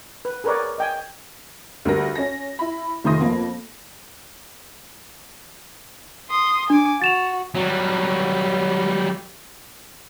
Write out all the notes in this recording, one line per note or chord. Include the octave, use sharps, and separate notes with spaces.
B4
G#4 A#4 B4 C#5 D5
D#5 G5 G#5
D2 G3 A#4 A#6
C#4 A#6
E4 B5
F1 D#3 A3 C6 D#6 A#6
F2 A#3 B3
C6 D#6
D4 G#5 D6
F#4 A6 E7 F7
F#3 G3